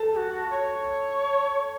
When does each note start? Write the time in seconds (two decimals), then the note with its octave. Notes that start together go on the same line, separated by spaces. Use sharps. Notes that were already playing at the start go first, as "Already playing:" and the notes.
Already playing: A4 A5
0.13 G#4
0.17 F#4
0.50 C#5